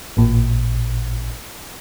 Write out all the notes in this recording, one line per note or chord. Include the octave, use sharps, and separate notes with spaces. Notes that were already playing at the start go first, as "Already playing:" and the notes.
A1 A#2